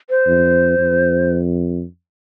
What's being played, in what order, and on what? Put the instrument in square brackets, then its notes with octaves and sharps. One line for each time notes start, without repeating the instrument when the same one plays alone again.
[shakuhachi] C5
[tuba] F2
F2